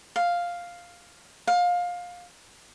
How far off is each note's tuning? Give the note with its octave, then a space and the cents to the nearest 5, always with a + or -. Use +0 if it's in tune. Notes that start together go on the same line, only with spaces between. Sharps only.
F5 +0
F5 +20